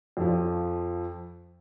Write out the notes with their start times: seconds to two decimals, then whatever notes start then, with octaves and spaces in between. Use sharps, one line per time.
0.17 F2 F3